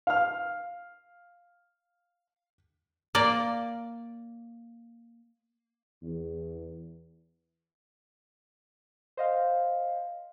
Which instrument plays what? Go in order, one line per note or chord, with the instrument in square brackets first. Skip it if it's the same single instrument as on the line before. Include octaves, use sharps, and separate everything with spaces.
[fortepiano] F5 F6
[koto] A#3 D5
[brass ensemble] E2
[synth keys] C5 D#5 F5